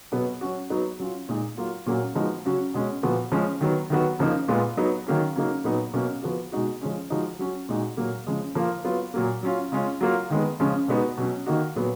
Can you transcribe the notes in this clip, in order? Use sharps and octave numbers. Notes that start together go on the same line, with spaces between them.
B2 F#3 B3
F#3 C#4 F#4
F#3 B3 D#4 F#4
F#3 C#4 F4
A#2 G#3 D#4
F#3 A#3 F4
A#2 F#3 A#3 C#4 F#4
F3 G#3 B3 D#4 F#4
C#3 F#3 C#4 F#4
B2 G#3 C#4
A#2 F3 B3 F#4
F3 G#3 C#4
D#3 F#3 B3
D#3 F#3 B3 F#4
C#3 F3 A#3 D#4
A#2 G#3 B3 F4
F#3 B3 D#4
D#3 F#3 A#3 C#4
C#3 F#3 A#3 D#4
A#2 F#3 B3 D#4
B2 F#3 A#3 C#4
F3 B3 F#4
B2 G#3 D#4 F#4
F3 G#3 C#4
F3 G#3 D#4 F#4
F#3 C#4 F#4
A#2 G#3 D#4 F#4
A#2 F#3 A#3
C#3 F3 G#3
F3 A#3 F4
F#3 B3 F4
A#2 F#3 A#3
F#3 C#4 F4
C#3 G#3 C#4 F4
F#3 A#3 F4
D#3 G#3 B3
C#3 F3 G#3 C#4 F4
B2 G#3 B3 D#4 F#4
B2 F#3 C#4
D#3 A#3 D#4 F#4
A#2 F#3 B3